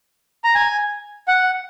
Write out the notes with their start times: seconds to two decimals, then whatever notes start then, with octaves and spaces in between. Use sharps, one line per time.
0.44 A#5
0.55 G#5
1.28 F#5